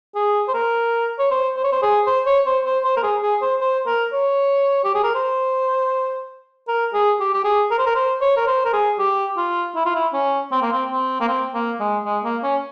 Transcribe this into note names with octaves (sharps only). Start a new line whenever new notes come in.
G#4
C5
A#4
C#5
C5
C5
C#5
C5
G#4
C5
C#5
C5
C5
C5
A#4
G#4
G#4
C5
C5
A#4
C#5
G4
G#4
A#4
C5
A#4
G#4
G4
G4
G#4
A#4
C5
A#4
C5
C#5
A#4
C5
A#4
G#4
G4
F4
E4
F4
E4
C#4
C4
A#3
C4
C4
A#3
C4
A#3
G#3
G#3
A#3
C#4